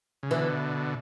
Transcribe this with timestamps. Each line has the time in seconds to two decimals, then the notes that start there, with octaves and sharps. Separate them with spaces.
0.23 C#3
0.31 B2 D3 E3